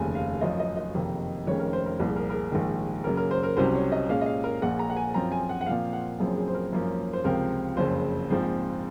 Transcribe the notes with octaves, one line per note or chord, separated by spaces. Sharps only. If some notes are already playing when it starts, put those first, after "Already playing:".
Already playing: F1 D#2 C#3 G#5
F5
G#1 F#2 F3 D#5
D#5
D#5
F#1 F2 C3 D#3
F1 F2 D#3 G#3 C#4 C#5
A#4
C5
A#4
C2 A#2 F3
G#4
A#4
A#4
G#4
A#1 G#2 D#3
F#2 C#3 F#3 A#3 A#4
A#4
C5
A#4
C2 C3 F#3 C#4 C5
C#5
D#5
A#2 G#3 C#4 F5
D#5
F5
A#4
A#1 A#2 G#3 F#5
A#5
F#5
G#5
F#2 F3 C4 F4 A#5
G#5
F#5
F#5
A#2 F3 C4 F5
F#5
F#1 F#2 F3 C4 G#4
G#4
C5
A#4
G#1 F#2 F3 A#3 C#4
C5
C#2 C3 F3 C4 A#4
F#1 F2 C#3 C5
A#1 G#2 F3 C4